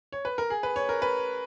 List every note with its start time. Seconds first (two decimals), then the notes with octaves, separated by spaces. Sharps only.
0.12 C#5
0.25 B4
0.38 A#4
0.50 G#4
0.63 B4
0.76 C#5
0.89 A#4
1.02 B4